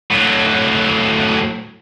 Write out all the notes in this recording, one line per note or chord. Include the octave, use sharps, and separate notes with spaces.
A2 F#3